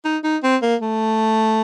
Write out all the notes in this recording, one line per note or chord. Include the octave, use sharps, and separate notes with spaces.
D#4
D#4
C4
A#3
A3